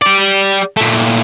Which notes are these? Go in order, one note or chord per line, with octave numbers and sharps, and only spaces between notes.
G4 D5
A#2 A3